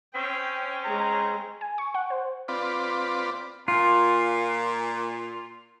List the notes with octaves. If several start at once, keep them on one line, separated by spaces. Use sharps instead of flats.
C4 C#4 G5
G#3 G#4 A#5
G#5
C#6
F#5
C5
C4 F4 B4 D5
A#2 F4